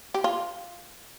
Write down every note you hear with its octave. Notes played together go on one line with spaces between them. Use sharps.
G4
F4